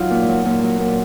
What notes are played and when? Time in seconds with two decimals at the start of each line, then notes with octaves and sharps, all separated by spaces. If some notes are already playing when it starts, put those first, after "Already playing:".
Already playing: F#3 D#4 F4
0.10 A#2
0.28 F#3
0.45 A#2
0.63 F#3
0.80 A#2